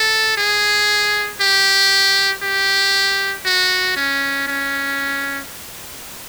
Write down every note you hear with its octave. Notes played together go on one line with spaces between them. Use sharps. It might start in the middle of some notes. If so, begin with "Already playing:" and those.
Already playing: A4
G#4
G4
G4
F#4
C#4
C#4